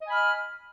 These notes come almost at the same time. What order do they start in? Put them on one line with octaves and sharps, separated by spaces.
D#5 G#5 B5 F6